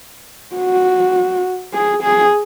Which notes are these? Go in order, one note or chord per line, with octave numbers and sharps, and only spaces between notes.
F#4
G#4
G#4